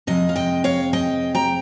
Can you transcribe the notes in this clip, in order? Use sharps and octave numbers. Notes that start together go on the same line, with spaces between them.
F2 C3 G#3 D#5
F5
D#5 G5
C#5 F5
D#5 G5
G5 A#5